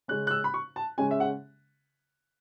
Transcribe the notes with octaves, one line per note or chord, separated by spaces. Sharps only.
C#3 G#3 C#4 F#6
F#6
E6
B5
C#6
A5
C#3 G#3 C#4 G#5
E5
F#5